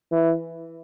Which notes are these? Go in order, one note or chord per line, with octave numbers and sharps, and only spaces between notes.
E3